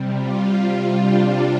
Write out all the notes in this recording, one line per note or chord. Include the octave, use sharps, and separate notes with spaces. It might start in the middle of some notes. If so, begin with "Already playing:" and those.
Already playing: C3 G3
F4
D4